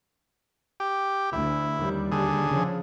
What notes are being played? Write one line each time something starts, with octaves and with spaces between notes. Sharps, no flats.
G4
D2 E4
D#2 G3
D3 G#4
C#3 F3